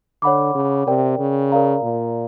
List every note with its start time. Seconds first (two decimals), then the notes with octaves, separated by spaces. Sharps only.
0.22 D3 C#5 F#5 B5 D6
0.55 C#3
0.87 C3 A#4 D5 G5
1.19 C#3
1.52 A#4 D5 F5 A#5
1.83 A#2